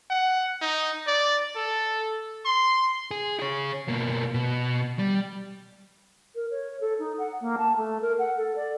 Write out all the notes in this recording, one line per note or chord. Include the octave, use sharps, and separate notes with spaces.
F#5
D#4
D5
A4
C6
G#4
G#4 C#5
B2 A#3
B2
G3
A#4
C#5
A4
D#4
F#5
A#3
A5
A3
A#4
F#5
A4
D5